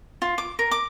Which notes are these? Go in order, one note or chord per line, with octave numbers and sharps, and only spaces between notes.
F4
D6
A#4
D6